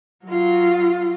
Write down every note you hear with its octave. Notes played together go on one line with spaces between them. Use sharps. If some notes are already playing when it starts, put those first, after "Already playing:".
F#3 F4